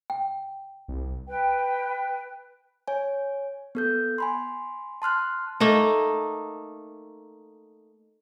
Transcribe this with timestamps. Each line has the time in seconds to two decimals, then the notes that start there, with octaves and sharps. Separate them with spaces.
0.10 G5
0.88 C2
1.26 B4 G5
2.88 C#5 G#5
3.75 B3 A4 G6
4.18 G#5 B5 C6
5.02 A5 C6 F6 F#6
5.60 A3 A#3 D#4